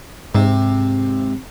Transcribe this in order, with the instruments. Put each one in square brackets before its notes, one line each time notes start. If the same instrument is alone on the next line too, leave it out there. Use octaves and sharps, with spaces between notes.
[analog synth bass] G#2 [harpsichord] C3